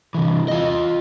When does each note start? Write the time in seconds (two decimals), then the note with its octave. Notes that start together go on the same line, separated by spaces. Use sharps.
0.15 C3 E3
0.48 F4 D#5